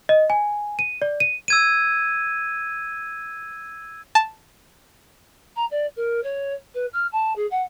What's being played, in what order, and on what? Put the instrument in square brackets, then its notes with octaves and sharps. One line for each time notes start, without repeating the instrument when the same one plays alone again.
[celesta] D#5
G#5
D#7
D5
D#7
[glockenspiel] E6 G#6 D#7
[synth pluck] A5
[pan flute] A#5
D5
A#4
C#5
B4
F6
A5
G#4
F#5